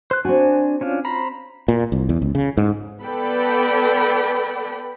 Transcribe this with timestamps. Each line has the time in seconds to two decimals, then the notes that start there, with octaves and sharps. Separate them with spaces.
0.11 C5 F#6
0.25 C4 D4 F#4 G#5
0.81 C#4 D4 F4
1.05 C5 A#5 B5
1.68 A#2
1.92 C2
2.09 E2
2.22 C#2
2.35 C#3
2.57 G#2
3.04 B3 A4 B4 D5 G5 B5